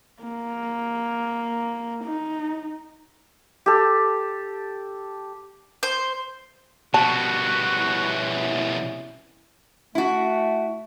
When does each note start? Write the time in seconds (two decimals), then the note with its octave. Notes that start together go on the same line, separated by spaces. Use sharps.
0.22 A#3
2.04 D#4
3.66 G4 A4
5.83 C5
6.94 B2 G3 F#4 A5
7.78 F#3 C#4 E4
9.95 A3 E4 F#4